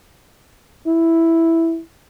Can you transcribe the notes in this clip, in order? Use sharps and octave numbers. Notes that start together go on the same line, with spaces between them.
E4